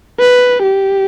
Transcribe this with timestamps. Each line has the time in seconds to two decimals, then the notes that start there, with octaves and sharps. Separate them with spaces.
0.20 B4
0.63 G4